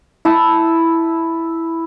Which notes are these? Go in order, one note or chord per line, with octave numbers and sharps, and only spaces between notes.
E4 A5 D#6